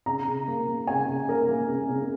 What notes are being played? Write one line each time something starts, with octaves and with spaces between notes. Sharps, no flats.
C#3 A#5
C#3
A#3
A#3
C#3 G#5
C#3
A#3 A#4
A#3
C#3
C#3